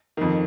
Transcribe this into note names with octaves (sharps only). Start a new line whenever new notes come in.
F2 D#3